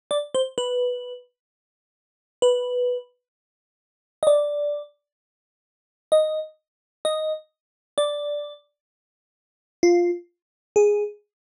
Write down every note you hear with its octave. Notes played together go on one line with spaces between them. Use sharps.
D5
C5
B4
B4
D#5
D5
D#5
D#5
D5
F4
G#4